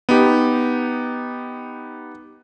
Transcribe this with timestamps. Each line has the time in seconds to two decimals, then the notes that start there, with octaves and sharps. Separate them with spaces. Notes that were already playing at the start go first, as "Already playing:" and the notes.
0.09 B3 D#4 G4